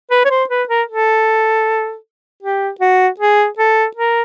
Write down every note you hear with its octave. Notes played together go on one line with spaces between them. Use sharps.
B4
C#5
C5
B4
A#4
A4
G4
F#4
G#4
A4
A#4